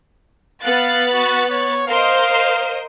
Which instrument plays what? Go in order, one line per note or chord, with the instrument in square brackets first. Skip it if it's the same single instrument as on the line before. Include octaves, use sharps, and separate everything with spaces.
[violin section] B3 F#6 A6 [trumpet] F5
[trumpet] F#4
C#5
[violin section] A#4 C5 D#5 [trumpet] F5